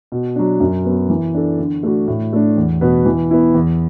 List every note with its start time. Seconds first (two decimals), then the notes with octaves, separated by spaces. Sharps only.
0.12 B2
0.36 F#3 D4
0.60 F#2
0.85 F#3 B3
1.10 E3
1.34 D4 A4
1.59 D3
1.83 A3 D4 F#4
2.08 A2
2.33 A3 D4
2.57 E2
2.81 B2 B3
3.05 E3
3.31 B3 E4
3.54 E2